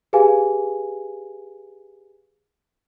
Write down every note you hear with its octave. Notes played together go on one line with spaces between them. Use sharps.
G4 G#4 B4 F5 G#5